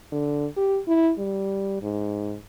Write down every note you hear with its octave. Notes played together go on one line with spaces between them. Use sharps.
D3
G4
E4
G3
G#2